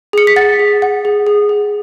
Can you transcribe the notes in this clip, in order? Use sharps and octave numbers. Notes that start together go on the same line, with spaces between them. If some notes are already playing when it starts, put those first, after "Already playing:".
G#4 C#7
B6
F#5 A6
G#4
F#5
G#4
G#4
G#4